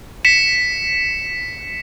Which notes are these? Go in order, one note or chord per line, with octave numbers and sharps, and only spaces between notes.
B6 C#7 E7